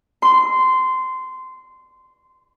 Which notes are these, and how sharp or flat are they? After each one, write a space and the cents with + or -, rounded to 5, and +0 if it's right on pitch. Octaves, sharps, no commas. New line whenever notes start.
C6 -15